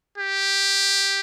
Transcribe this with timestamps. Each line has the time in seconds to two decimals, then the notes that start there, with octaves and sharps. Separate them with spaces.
0.18 G4